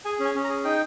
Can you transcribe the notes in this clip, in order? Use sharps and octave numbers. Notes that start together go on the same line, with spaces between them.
G#4 G#5
C#4
G#5
C#4
A#5
G#4
D#4 G5